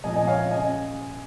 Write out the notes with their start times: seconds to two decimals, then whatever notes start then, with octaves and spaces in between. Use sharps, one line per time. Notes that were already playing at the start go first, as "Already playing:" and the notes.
0.04 A#2 F3 A#3 D#5 G#5
0.16 D#5 G#5
0.27 C#5 F5
0.51 C#3 D#5 G#5